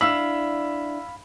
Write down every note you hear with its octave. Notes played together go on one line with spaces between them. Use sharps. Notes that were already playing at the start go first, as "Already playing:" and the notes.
D4 E4 F5 B5 E6